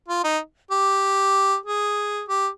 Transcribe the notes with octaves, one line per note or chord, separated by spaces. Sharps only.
F4
D#4
G4
G#4
G4